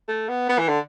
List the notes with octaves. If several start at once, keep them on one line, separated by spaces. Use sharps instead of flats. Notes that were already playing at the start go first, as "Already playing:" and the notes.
A3
B3
B3
E3
D3